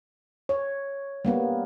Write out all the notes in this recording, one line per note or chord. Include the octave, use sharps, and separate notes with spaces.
C#5
G3 A#3 B3